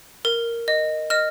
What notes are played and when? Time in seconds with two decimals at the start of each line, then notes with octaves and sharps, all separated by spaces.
0.25 A#4
0.68 D#5
1.10 D#5 F6